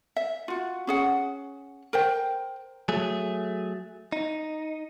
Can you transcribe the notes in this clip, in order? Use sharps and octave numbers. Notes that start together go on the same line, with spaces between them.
E5
F4 F#4
C#4 G#4 F#5
A#4 C5 G5
F#3 A3 G#4
D#4